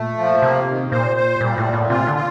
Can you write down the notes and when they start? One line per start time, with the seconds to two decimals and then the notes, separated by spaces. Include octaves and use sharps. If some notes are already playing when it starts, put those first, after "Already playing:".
Already playing: A#2 A3
0.17 F3
0.42 C3 A#3
0.67 D#3
0.92 A#2 C5
1.17 C5
1.41 A#2 G3
1.58 A2
1.65 A#2
1.73 A2
1.90 C3 F4
2.07 D3
2.15 F4